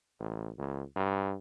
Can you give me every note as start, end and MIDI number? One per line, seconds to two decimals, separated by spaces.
0.20 0.50 33
0.58 0.83 37
0.96 1.36 43